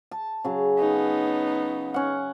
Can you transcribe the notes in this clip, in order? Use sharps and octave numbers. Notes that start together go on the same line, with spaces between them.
A5
C#3 F#3
B3 D#4
C#4 F#5